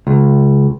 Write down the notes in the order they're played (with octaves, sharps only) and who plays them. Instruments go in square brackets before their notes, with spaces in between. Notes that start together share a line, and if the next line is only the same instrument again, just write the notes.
[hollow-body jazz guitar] C#2